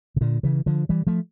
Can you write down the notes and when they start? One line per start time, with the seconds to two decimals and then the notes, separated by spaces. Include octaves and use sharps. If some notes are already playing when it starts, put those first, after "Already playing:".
0.16 C#3
0.21 A#2 D3
0.43 C#3 E3
0.66 D3 F3
0.89 E3 G3
1.07 F3 A3